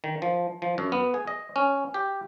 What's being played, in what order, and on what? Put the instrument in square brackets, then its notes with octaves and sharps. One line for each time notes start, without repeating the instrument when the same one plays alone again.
[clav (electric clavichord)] D#3
F3
F3
F#2
B3
G#4
D#5
C#4
G4